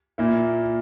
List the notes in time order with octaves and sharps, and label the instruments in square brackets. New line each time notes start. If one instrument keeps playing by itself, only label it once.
[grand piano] A#2 A#3 E4